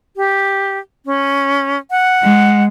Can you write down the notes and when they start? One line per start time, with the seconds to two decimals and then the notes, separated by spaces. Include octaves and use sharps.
0.17 G4
1.06 C#4
1.91 F#5
2.23 G#3